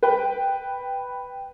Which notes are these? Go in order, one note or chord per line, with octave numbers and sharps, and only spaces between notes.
B4 G5 B5